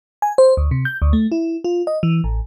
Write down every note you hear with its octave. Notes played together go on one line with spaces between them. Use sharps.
G#5
C5
D2
C3
G6
D2
A3
E4
F4
D#5
E3
A1